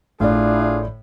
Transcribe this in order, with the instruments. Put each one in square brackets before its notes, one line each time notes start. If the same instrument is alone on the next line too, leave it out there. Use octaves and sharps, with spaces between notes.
[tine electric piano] G#1 D5 [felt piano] A2 [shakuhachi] D4 [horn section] E4 F4 G#4